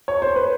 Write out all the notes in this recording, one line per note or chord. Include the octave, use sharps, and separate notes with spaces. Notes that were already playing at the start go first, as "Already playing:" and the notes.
C#5
C5
B4